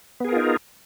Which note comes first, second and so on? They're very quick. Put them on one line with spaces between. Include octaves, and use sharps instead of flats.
B3 G#4 A#4 F4 D#4